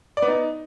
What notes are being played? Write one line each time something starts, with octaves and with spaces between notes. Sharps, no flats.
D5
B3
D#4